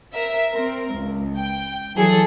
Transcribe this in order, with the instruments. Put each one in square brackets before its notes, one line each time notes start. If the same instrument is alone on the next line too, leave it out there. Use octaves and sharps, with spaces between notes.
[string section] A#4 E5
C4 A#4
C#2
G5
E3 F#3 G#4 A4